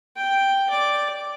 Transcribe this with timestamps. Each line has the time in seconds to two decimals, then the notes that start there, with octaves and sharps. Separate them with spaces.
0.17 G5
0.70 D5